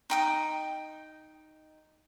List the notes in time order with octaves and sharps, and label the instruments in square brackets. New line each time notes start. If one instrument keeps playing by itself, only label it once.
[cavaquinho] D#4 G5 D#6